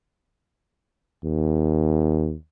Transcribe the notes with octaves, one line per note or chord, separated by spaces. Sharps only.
D#2